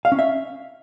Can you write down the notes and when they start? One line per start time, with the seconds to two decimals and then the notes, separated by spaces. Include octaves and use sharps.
0.05 F5
0.12 C#4
0.19 E5